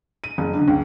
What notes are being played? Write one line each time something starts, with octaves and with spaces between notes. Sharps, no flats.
D#7
F#1
D3
C#2